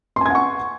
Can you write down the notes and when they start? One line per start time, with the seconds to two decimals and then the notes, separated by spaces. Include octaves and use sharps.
0.16 C6
0.21 G#5
0.26 G#6
0.30 F#5
0.35 C#6